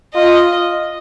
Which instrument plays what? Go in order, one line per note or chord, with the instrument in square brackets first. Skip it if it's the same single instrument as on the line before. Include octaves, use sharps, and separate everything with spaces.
[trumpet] F4 [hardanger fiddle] D#5